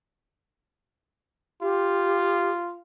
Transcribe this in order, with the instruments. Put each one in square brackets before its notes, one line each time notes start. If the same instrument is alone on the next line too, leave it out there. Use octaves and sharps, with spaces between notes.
[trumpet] F4 [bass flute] G4